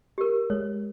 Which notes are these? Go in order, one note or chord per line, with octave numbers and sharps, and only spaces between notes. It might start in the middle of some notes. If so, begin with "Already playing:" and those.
G4 A#4
G#3 C#5